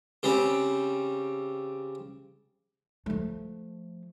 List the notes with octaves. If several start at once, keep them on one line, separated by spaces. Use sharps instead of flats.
C#3 G3 C4
F3 A3